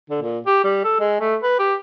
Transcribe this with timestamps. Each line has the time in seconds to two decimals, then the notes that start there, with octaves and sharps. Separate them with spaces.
0.10 D3
0.22 A#2
0.46 G4
0.64 G3
0.84 A4
1.00 G#3
1.20 A3
1.43 B4
1.59 G4